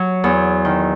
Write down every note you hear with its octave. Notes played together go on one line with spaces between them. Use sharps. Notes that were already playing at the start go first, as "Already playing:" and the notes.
Already playing: F#3
E2
D#3